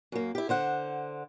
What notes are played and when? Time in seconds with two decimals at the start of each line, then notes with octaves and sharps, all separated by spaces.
0.12 F#2 A#3
0.35 E4 G4
0.49 D3 C5 F#5